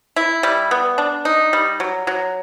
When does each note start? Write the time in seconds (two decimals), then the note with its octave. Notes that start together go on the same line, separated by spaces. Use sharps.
0.16 E4
0.43 G3
0.71 B3
0.98 D4
1.25 D#4
1.53 G3
1.80 F#3
2.07 F#3